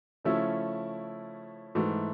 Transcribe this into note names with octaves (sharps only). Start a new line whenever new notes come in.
C#3 F3 A3 C#4 E4
G#2 E3 A3